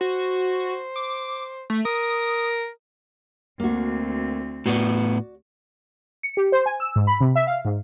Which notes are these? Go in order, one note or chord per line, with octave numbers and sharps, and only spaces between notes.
F#4 C5
D6
A3
A#4 D#6
D2 A#3 C4 F#4
A2 B3 F#4 D5
C#7
G4
C5
G#5
E6
G#2
B5
C3
E5
F5
G#2